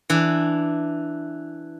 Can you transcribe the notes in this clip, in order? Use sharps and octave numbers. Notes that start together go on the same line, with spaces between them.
E3 D4